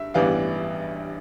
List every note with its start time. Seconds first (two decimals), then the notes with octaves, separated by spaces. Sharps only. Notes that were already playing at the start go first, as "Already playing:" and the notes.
Already playing: G2 E5
0.14 A1 G2 E3 G3 B3 F5